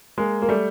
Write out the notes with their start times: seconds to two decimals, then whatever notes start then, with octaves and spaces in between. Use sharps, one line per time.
0.18 G#3 A#3
0.42 A#3
0.49 G3 A3